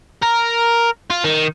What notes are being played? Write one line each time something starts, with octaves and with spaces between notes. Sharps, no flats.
A#4
F4
D#3